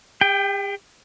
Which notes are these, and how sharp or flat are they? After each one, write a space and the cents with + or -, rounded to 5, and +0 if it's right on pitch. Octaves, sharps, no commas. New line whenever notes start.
G4 +45 G5 +0